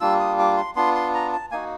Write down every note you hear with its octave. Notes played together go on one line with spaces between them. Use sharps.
G3 A#3 D4 F4 E6
D#6
D6
C6
B3 D4 F4 C6
C6
A#5
A5
A#3 D#4 F#4 G#5